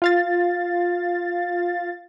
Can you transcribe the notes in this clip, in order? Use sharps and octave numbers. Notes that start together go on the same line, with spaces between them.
F4 F5 A6